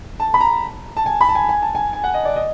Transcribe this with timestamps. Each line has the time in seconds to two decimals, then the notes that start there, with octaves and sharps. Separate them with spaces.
0.20 A5
0.34 B5
0.41 A#5
0.97 A5
1.06 G#5
1.21 B5
1.29 A5
1.35 G#5
1.49 G#5
1.62 A5
1.75 G#5
1.93 G#5
2.04 F#5
2.14 D#5
2.25 D5
2.36 D#5